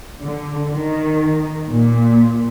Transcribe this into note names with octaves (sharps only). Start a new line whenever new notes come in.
D3
D#3
A#2